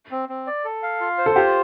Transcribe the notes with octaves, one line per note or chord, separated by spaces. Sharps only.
C4
C4
D5
A4
F5
F4
C5
A4
F4 G4